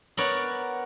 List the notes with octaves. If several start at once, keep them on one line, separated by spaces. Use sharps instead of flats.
B3 A#4 C#5 D5